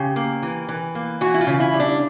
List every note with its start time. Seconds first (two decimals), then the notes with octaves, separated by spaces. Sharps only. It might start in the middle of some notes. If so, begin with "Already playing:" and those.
Already playing: C#3 G4
0.16 A#3
0.42 E3
0.68 E3
0.95 A#3
1.21 E3 F#4
1.34 E4
1.41 F4
1.47 C#3
1.60 E4
1.74 G3
1.80 D4